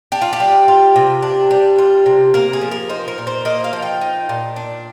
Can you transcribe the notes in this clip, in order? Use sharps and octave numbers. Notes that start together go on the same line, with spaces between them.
D4 G4
F4
G4
G3
F4
C3
D4
G3
F4
C3
A#3 A#4
G#4
F3
A#4
D#4 C5
A#4
A#2
C5
A#3 D#5
F5
F3
G5
D#4
A#2
D4